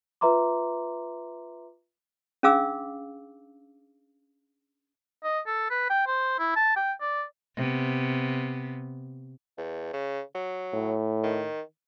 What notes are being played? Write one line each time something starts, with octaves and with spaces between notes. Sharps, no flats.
F4 B4 E5 A#5 C6 D6
C#4 D4 G#4 F5 D6 E6
D#5
A4
B4
G5
C5
E4
A5
G5
D5
C3 B3
E2
C#3
F#3
A2
D#3